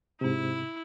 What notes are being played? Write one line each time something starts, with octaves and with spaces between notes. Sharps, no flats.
G#2 C3 E4